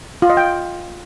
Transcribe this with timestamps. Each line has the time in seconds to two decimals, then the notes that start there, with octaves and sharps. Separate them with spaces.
0.22 F4
0.30 D#5
0.37 G5